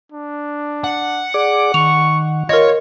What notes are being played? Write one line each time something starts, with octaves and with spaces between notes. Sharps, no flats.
D4
F#5
G#4 D5 D6
D#3 C#6 F7
F4 A#4 C#5 D#5